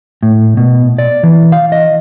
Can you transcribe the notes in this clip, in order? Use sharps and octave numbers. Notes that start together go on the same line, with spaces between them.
A2
B2
D5
E3
F5
D#5